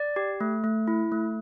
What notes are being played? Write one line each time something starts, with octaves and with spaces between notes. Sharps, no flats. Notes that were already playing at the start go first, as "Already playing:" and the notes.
Already playing: D5
G4
A3
A3
E4
A3